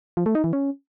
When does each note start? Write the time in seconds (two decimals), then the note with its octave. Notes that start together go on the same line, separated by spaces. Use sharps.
0.17 F3
0.26 A3
0.35 D#4
0.44 E3
0.53 C#4